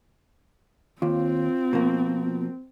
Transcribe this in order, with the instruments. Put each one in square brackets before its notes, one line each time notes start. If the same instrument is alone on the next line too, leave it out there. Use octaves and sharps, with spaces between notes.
[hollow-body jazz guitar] D#2 [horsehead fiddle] C4 [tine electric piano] F4
[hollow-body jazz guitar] B2 F3 A#3